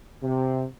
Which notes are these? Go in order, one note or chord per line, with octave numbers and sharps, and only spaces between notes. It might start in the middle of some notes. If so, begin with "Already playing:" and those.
C3